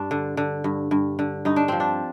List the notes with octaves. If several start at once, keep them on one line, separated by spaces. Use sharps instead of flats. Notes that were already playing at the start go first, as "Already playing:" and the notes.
Already playing: G2 D4
D3
D3
G2
G2
D3
G2 D#4
D4
F3 C4
D4